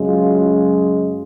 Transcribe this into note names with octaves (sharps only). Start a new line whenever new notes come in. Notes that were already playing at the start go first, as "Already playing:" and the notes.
Already playing: F#2 C#3 G#3
F4